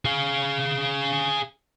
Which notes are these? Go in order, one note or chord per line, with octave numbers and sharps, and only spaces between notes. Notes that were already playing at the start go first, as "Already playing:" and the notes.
G#4 F5